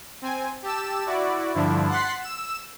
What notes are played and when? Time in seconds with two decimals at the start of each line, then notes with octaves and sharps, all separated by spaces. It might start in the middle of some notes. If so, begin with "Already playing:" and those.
0.22 C4 G#5
0.62 G4 A5 E6 E7
1.06 E4 F#4 D5
1.54 G2 D3 F3 D4 E4
1.89 F#5 C6 F#6 A6 B6 C7
2.21 E6 E7